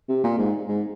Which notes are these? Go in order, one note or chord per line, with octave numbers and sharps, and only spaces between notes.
C3
A#2
G#2
G#2